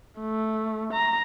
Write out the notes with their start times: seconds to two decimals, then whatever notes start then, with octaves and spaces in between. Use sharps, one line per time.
0.20 A3
0.93 A#5